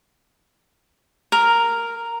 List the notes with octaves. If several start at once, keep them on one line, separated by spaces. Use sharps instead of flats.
A#4